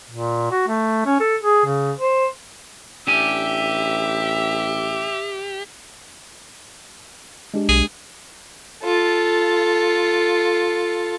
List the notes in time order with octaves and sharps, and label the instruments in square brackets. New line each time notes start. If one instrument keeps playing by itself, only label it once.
[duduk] A#2
F#4
A3
C#4
A4
G#4
C#3
C5
[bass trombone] A1 [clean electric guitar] D4 G#5 [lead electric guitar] G4 [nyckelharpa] E5
[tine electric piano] G#3 D4 G4
[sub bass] B1 [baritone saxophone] G#4
[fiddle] F4 A4